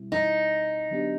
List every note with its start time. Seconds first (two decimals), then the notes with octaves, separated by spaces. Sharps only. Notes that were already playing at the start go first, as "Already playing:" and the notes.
Already playing: B2 G3 C4 E4
0.12 D#4
0.91 D3 F#3 B3 D4 G4